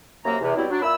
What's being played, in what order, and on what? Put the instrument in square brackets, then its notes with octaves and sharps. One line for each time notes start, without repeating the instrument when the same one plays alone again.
[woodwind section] F#2 C3 F#3 A#3 A#5
E2 C3
B2 F#3 G3 C4 E4
F#3 D4
A#2 E4 B5 E6